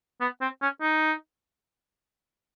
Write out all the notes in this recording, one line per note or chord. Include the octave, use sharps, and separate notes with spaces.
B3
C4
C#4
D#4